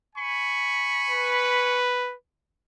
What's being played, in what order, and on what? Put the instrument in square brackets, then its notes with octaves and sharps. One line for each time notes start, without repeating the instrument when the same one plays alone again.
[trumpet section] G#5 B5 C#6
[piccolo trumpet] B4